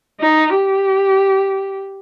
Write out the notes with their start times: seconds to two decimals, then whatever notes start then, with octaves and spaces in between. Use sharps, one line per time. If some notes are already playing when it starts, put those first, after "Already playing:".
0.20 D#4
0.54 G4